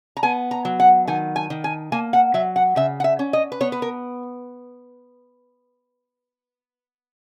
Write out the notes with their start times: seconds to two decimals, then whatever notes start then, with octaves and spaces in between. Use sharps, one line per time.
0.17 A#5
0.23 B3 G#5
0.51 A#5
0.65 F#3
0.80 F#5
1.08 D#3 G#5
1.36 G#5
1.50 D#3
1.64 G#5
1.92 A#3 G#5
2.13 F#5
2.34 F#3 E5
2.56 F#5
2.76 C#3 E5
3.00 F#5
3.04 E5
3.19 C#4
3.33 D#5
3.52 B4
3.61 B3 C#5
3.72 B4
3.82 A#4